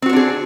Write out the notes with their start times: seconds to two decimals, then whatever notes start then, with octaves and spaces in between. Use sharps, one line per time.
0.02 C4
0.06 F#4
0.09 C5
0.13 D4
0.16 G#4